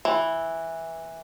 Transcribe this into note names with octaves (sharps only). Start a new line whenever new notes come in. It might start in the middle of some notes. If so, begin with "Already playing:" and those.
E3